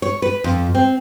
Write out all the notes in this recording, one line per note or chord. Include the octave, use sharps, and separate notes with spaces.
C#5
B4
F2
C4